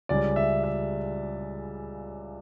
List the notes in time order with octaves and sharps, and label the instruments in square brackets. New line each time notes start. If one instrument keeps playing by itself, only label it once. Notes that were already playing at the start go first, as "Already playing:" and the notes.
[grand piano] C#2 C#3 G3 D5
E5
E5